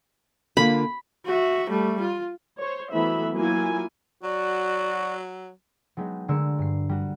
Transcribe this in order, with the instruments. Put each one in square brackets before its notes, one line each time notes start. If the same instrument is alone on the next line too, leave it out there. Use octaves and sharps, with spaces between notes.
[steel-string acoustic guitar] D3 A#3 F4 [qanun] B5
[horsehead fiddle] F#4 E5
G3 A3
F4
[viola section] C5 C#5
E3 F#3 A3 B3 E5 B5
F#3 A#3 E4 F4 G#5
[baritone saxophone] F#3 [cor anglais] F#4 [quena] D5
[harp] F#3 G#3 B3 D#4 F#4 G4
D3 G#3 A3 A#4 E6 C#7
G2 C7
G3 F#4